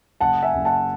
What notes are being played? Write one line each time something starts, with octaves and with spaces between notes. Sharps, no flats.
F#1 F#5 A5
E5 G#5
F#1
F#5 A5